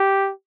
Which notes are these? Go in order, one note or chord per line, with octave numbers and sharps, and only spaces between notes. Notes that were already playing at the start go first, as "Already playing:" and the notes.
Already playing: G4